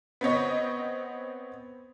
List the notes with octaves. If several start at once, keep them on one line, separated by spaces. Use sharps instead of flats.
B3 C4 C#5 D#5